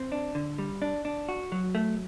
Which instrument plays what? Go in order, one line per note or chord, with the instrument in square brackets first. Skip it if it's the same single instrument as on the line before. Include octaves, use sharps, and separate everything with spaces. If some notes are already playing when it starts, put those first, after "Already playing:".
Already playing: [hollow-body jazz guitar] C4
D4
D3
G3
D4
D4
F#4
F#3
A3